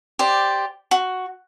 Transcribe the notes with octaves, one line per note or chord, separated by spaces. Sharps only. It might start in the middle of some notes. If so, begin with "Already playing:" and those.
G4 C5 D5
F#4